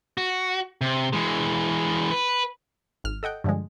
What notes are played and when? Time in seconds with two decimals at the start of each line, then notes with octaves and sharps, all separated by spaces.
0.18 F#4
0.81 C3
1.13 E3 G#3
2.11 B4
3.04 G#1 F6
3.23 A4 D#5 F#5 G5
3.44 G2 D3 F3 G#3